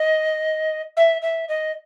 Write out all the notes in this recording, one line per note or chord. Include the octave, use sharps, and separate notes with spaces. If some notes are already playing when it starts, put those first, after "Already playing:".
Already playing: D#5
E5
E5
D#5